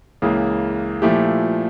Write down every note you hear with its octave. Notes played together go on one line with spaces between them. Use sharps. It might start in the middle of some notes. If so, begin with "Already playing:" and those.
C#2 C#3 E3 A#3
A#2 F3 A3 E4 G4